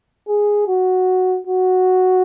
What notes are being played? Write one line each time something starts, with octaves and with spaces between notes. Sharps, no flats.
G#4
F#4
F#4